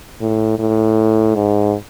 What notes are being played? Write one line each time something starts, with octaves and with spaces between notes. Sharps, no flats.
A2
A2
G#2